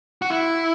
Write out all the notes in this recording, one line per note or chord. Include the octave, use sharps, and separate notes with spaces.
F#4
E4